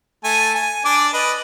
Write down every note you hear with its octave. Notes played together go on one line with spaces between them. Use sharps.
A3 G#5 A5
G#5
D4 D5 D6
B4 D#5